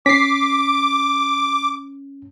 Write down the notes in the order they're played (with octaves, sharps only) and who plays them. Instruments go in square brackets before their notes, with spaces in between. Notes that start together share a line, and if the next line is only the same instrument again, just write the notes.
[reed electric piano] C#4 [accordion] D6 [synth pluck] B6 C7